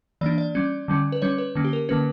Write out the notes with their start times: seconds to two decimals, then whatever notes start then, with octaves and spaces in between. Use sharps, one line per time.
0.21 E3 A#3 D4 D5
0.38 D5
0.55 G3 C#4
0.88 D3 G3 C#4
1.12 B4
1.22 G3 C#4 C#5
1.38 B4
1.55 D3 A#3 C#4
1.65 G4
1.73 A#4
1.89 D3 A#3 C#4 B4